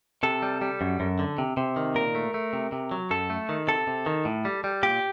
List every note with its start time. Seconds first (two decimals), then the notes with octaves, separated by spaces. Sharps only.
0.23 C3 A4
0.42 G3
0.61 G3
0.81 F#2
1.00 F#2
1.19 D3
1.38 C3
1.57 C3
1.76 D#3
1.95 A#2 A#4
2.15 A3
2.34 A3
2.53 C3
2.72 C3
2.91 F#3
3.11 F#2 A4
3.30 A3
3.49 D#3
3.68 C3 A4
3.87 C3
4.06 D#3
4.25 A2
4.45 G3
4.64 G3
4.83 A#2 G4